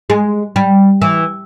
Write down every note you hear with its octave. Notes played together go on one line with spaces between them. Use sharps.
G#3
G3
E3